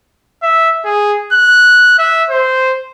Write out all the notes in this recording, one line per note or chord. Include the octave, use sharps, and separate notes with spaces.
E5
G#4
F#6
E5
C5